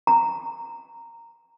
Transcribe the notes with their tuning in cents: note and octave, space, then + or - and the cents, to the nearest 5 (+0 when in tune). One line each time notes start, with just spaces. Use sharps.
A#5 -10